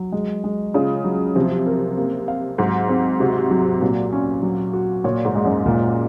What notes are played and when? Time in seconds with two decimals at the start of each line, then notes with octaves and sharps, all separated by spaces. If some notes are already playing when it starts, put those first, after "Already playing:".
Already playing: F#3
0.12 G#3
0.44 G#3
0.74 C#3 F4
1.05 F#3
1.36 C3 F3
1.67 A#4
1.97 A#3
2.28 F5
2.58 G#2 F#3
2.89 C4
3.20 C3 F#4
3.51 F#3
3.81 A#2 F#3
4.12 C#4
4.43 F#3
4.73 F#4
5.04 A#2 C#5
5.25 G#2
5.35 G#3
5.45 F#2
5.66 A#2